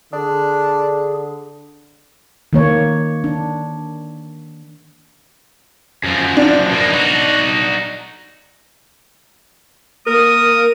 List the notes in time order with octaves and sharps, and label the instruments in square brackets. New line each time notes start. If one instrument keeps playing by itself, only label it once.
[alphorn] D3 [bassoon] D4 [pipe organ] G#4
[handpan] D#3 A#3 C#5
D4
[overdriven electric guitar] F#2 F3
[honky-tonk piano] D4
[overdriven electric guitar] B2 A#3
D#4 F#4
[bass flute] A#3 [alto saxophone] A#4 [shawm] D#6